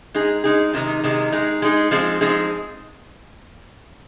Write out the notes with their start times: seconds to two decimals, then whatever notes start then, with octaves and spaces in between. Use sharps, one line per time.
0.14 G#3 D#4 G#4
0.44 G#3 D#4 G#4
0.73 C3 D#3 G#3 D#4
1.04 C3 D#3 G#3 D#4
1.32 G#3 D#4 G#4
1.62 G#3 D#4 G#4
1.91 F3 G#3 C4 D#4 G#4
2.21 F3 G#3 C4 D#4 G#4